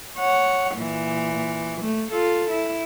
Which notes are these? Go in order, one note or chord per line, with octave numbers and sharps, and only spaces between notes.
C#5 F#5
A#2 E3
A3
F4 A4
E4